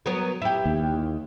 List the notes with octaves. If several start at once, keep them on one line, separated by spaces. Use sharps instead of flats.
F#3 B3 A#4
E4 G4
D#2